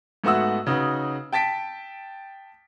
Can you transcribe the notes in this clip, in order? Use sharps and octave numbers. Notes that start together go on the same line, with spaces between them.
G#2 A3 B3 F#4 C#6 E6
C#3 D#4 F#4 B4
G5 A5 A6 B6 D7